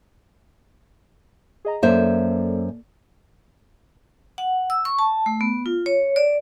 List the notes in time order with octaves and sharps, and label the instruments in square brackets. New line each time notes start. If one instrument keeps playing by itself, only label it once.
[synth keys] G#4 D#5 A#5
[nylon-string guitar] F#2 C5 E5 [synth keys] A#3 A4 D5
[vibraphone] F#5
E6
C#6
A5
A3
B3
F4
C#5
D5